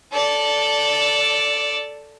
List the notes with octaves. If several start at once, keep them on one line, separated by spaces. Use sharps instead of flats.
A4 D5